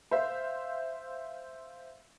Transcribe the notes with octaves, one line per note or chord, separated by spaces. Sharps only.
C5 E5 F5